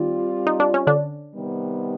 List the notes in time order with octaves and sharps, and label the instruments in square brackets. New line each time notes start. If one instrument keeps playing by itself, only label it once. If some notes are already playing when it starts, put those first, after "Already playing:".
Already playing: [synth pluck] D#3 [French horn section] G3 C4 F4
[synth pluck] D#4
D4
C#4
D3 D4
[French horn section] C3 D#3 G3 B3